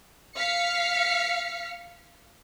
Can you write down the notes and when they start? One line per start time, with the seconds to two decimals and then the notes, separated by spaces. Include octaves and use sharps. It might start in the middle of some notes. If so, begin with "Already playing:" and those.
0.36 F5 F6 B6 C#7